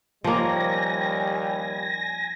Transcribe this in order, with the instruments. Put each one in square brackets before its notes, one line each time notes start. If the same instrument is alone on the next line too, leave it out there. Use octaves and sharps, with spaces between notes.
[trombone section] D#2 G3 [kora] F3 A#3 [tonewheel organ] G#5 A#6